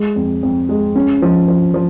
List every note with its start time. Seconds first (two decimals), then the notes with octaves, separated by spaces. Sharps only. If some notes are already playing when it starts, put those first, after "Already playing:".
Already playing: G#3
0.16 F2
0.43 F2
0.69 G#3
0.96 C#4
1.22 F3
1.48 F3
1.74 F3